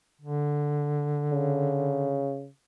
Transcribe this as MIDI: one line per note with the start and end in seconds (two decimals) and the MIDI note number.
0.21 2.28 50
1.32 2.49 49